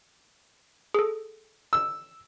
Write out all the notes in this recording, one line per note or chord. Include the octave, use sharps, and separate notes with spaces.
G#4 A4
E6